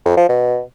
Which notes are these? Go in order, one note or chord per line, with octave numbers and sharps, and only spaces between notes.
F2
F3
B2